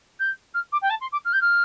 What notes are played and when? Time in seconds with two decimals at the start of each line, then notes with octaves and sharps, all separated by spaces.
0.19 G6
0.54 F6
0.72 D6
0.81 G5
0.90 A5
1.00 C6
1.12 D6
1.24 F6
1.33 G6
1.41 F6